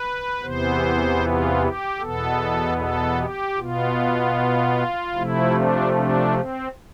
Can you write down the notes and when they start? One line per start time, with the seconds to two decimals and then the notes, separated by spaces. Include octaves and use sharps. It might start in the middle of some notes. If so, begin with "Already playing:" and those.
Already playing: B4
0.42 E2 C3 E3 B3 C5
1.21 F4
1.61 G4
2.00 E2 B2 B3 A4
2.78 A4
3.18 G4
3.57 B2 B3 F4
5.14 C3 F3 A3 E4
5.54 D4
5.93 D4
6.33 C4